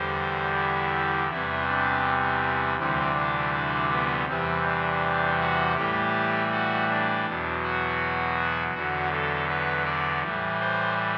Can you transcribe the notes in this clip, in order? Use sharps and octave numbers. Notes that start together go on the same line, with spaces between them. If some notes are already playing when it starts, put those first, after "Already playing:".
Already playing: E2 D3 G3 C5
E4
E2 C3 E3 G3 E4
D4
D2 C3 E3 G3 C4
D4
D4
B3
E2 C3 E3 G3 C4
D4
F#4
A2 E3 G3 G4
F#4
D4
E2 B2 F#3
F#4
E2 D3 F#3 F#4
A4
B4
D5
A2 E3 G3
C5